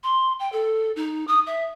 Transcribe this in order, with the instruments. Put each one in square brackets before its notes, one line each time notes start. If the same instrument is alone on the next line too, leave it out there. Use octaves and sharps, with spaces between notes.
[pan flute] C6
G5
A4
D#4
D#6
E5